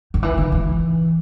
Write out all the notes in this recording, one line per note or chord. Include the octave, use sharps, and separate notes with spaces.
D#3
E3
D#3
E3